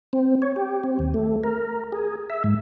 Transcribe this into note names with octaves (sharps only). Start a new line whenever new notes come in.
C4
C#5
G4
C4
D#2
A3
A#4
G#4
E5
G#2